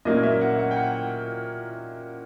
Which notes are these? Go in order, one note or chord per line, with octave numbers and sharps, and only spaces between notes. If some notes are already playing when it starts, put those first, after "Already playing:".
A#2 F#3 A#3 C#4 D#5
E5
F#5
F#5
G5
F#5